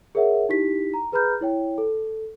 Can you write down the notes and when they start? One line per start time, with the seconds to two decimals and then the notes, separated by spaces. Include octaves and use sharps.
0.15 G#4 A#4 C#5 E5 F#5
0.49 D#4 E4 G4 B6
0.94 A#5
1.12 G#4 B4 A#5 B5 F6 G6
1.41 E4 C#5 G5
1.78 A4